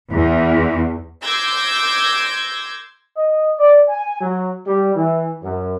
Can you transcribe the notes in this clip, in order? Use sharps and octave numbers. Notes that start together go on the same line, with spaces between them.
E2
C6 D6 E6 G6 G#6 A#6
D#5
D5
G#5
F#3
G3
E3
F#2